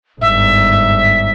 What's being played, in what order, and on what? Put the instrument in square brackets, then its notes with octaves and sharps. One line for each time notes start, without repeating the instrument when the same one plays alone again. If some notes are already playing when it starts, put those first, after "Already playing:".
[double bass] G1 G#2 [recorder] E5